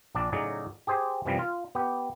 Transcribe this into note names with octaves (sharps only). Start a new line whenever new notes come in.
A#1 D4 D5
A2 C#3 F#3 D#4 G#4 D5
G4 G#4 C5 G#5
F#2 C3 E3 F3 G3
F4
B3 G4